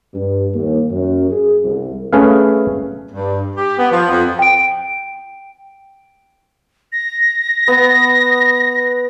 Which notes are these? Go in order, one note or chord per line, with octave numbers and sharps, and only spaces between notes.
G2
D#2
F#2
G#4
C2
A3 C#4 G#4 B4 F5
G2
G4
B3
F3
F2
G5 D7
A#6
B3